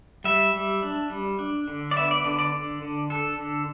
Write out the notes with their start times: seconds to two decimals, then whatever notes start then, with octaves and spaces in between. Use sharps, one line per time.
0.24 G3 E5
0.54 G3
0.83 D4
1.10 G3
1.39 D4
1.68 D3
1.91 D5
1.96 B3 E5
2.11 D5
2.24 D3 D5
2.39 D5
2.54 D3
2.82 D3
3.10 D4 A4
3.38 D3